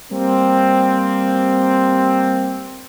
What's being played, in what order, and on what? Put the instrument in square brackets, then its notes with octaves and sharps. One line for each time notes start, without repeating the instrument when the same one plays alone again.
[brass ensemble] G3 A#3 C4